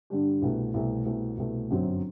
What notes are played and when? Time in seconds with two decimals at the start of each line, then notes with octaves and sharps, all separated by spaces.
0.10 G2 D3 G3 D4 G4
0.42 C2 B2 A3
0.74 C2 B2 A3
1.06 C2 B2 A3
1.38 C2 B2 A3
1.70 G1 F#2 F#3 C4 F#4